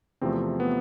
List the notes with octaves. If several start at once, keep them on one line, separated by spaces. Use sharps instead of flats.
E2 C3 F3 A3 C4
B3